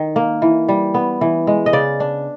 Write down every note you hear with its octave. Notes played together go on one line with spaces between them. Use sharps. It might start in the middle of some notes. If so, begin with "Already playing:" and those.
Already playing: D#3
A#3
E3
G3
B3
E3
G#3
D#5
C#3 D5
D4